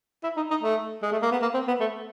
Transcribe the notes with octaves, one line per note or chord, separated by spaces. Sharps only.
E4
D#4
D#4
A3
G#3
A3
A#3
B3
A#3
C4
B3
A3